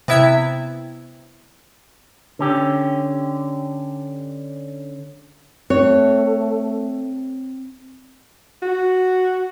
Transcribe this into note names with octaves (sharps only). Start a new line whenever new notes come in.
C3 B3 E4 E5 G#6
D3 C#4 G4
A3 C4 C#5
F#4